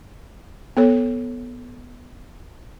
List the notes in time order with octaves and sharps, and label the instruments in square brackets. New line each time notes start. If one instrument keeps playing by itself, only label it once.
[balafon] B3 A4 C#5